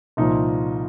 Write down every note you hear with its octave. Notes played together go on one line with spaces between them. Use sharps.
C2 A#2 F3 D#4